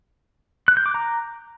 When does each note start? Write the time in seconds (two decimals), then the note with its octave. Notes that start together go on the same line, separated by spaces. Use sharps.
0.68 F#6
0.77 G6
0.86 D6
0.94 A#5